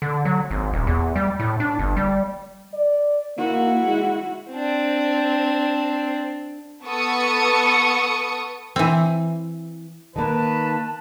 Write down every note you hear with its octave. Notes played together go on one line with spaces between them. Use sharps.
D3
F#3
G#1
D#1
E2
G3
A2
D4
G1
G3
D5
A#3 E4 F#4
G#3
C4 D4
B3 A4 C#6 D#6 C#7
E3 C4
D#3 A#3 B4 A5